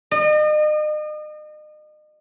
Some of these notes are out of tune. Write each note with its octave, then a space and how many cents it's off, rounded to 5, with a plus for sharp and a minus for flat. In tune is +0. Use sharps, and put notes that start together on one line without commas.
D#5 -40